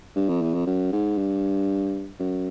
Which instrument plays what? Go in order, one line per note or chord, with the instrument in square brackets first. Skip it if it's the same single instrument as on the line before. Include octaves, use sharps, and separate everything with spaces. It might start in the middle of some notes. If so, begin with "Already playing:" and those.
[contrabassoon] G2
F2
E2
F2
F#2
G#2
G2
F#2